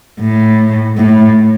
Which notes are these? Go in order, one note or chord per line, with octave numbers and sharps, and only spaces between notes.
A2
A2